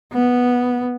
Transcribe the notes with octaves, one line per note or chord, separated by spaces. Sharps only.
B3